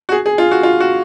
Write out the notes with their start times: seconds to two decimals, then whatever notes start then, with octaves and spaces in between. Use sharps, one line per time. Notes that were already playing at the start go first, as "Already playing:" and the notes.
0.09 F#4
0.12 G#4
0.26 G#4
0.38 F4
0.51 F#4
0.63 F4
0.80 F#4